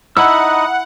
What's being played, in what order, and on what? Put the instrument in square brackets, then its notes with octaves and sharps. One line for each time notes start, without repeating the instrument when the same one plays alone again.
[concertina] D#4 D#5 [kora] E4 [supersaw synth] F#5 [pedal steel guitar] B5 E6